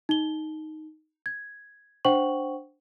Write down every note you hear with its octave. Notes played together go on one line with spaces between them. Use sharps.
D#4 G7
G#6
D4 C5 F#5 G5 C#6 F#7